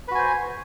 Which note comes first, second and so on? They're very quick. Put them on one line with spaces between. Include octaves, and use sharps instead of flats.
B4 F#4 G#5 C5